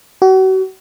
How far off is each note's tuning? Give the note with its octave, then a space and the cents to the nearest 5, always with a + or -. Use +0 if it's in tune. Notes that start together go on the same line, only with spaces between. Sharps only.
F#4 +35